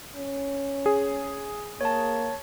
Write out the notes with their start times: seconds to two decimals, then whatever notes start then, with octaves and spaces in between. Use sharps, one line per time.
0.16 C#4
0.86 G#4
1.81 A#3 C#5 A5